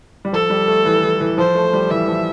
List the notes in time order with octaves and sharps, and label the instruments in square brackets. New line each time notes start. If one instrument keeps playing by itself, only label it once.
[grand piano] G3
[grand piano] F3 [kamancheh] A4
[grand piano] G3
A3
E3
E3
E3
[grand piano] F3 [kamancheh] C5
[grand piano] A3
G3
[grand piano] E3 [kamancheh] E5
[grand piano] F3